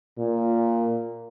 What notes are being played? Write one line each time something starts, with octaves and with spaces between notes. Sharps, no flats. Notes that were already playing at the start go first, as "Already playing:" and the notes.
A#2